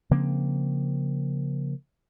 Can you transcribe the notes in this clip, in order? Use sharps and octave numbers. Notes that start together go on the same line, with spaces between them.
C#3 F3 A#3 C4